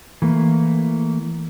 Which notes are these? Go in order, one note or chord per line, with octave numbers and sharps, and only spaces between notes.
E3 A3 A#3